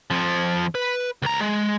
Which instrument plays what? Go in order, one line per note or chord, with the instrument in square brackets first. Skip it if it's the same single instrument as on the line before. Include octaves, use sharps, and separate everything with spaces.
[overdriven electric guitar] F2 F3
B4
C#2 A#5
G#3